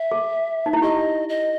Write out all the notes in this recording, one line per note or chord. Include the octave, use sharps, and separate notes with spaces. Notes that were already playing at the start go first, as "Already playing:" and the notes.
Already playing: E5
G#4
D#4
E4
G4 D#5
D#5